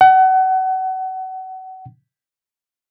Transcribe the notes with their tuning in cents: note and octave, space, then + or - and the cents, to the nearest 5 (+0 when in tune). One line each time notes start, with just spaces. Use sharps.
F#5 +30